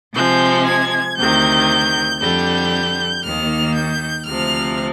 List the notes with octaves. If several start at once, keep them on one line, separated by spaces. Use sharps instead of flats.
C3 F3 G#3 G6
G#6
D2 C3 D#3 G6
F2 D3 G3 G6
D#2 D#3 A#3 F6
G6
D2 C3 F3 F6